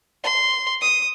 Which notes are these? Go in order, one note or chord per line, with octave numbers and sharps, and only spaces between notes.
C6
D#6